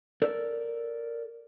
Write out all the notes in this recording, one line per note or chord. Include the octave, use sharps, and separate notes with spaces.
A4 A#4 D5